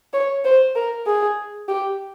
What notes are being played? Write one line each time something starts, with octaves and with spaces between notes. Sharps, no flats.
C#5
C5
A#4
G#4
G4